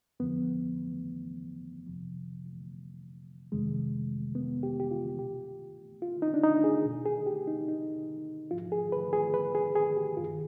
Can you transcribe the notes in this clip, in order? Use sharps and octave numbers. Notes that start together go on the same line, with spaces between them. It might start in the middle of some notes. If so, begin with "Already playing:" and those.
F2 D3 F3 B3
F2 C3 F3
F2 C3 D#3 G#3
B3
G4
G4
F4
B2 G4
F4
D#4
D4
D#4
G#4
B2
G#4
G4
D#4
D#4
G#2 F3 F4
G#4
B4
G#4
B4
G#4
G#4
G4
G2 D#3 F4